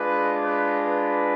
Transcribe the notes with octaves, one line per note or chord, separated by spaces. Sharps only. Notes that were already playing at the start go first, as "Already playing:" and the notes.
Already playing: G#3 D4 F4 B4
B4
B4